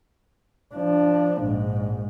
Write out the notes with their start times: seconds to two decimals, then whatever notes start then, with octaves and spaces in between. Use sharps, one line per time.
0.75 F3 D4
1.42 A#1 G#2